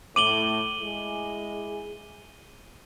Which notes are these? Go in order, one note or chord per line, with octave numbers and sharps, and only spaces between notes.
A2 D6 D#7 F#7 G7
G#3 E4 G#4